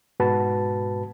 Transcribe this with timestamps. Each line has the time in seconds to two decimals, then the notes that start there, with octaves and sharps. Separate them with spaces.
0.20 G#2 B2 F#4 B4 A5